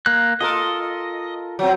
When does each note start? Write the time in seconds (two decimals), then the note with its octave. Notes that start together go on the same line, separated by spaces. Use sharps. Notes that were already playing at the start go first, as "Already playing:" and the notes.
0.06 A#3 F#6
0.40 F4 A4 A#4 D#5
1.59 F#3 C4